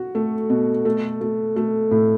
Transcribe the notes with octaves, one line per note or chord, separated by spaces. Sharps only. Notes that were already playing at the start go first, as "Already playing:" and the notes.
Already playing: F#4
A3
B2
A3
A3
A3
A2